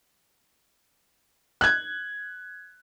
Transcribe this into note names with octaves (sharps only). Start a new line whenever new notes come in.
F#6 G#6